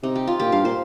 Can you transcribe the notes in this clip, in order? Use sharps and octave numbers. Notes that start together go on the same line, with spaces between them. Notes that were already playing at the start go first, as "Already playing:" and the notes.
C3 D#4
G4
F4
A#2 G4
G2 F5
A#2 C5